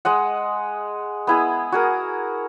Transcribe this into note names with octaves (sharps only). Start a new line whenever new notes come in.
G#3 D#5 F#5
B3 E4 G#4
F#4 G#4 A#4